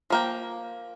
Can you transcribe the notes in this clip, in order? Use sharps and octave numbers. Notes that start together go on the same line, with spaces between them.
F3 A#3 G5